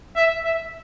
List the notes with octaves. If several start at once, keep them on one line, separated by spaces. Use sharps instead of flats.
E5
E5